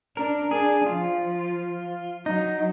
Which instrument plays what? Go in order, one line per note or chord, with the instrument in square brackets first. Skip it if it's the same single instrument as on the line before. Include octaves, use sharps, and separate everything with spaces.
[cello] D4 [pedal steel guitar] A#4
[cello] D4 [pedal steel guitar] G#4
[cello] F3 [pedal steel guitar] F4
[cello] F#3 [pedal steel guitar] D#4